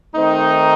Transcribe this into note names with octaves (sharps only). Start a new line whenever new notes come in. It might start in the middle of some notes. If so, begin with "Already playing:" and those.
D#3 A3 C4 D#4